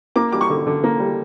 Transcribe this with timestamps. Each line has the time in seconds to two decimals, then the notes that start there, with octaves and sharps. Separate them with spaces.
0.16 A#3 D6
0.32 G3 D6
0.41 C#6
0.50 D3
0.67 D3
0.84 A#3
1.00 G3